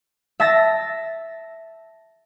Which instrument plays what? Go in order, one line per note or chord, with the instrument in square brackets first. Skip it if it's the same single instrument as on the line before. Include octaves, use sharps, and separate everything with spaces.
[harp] E5 A5 E6 A6 A#6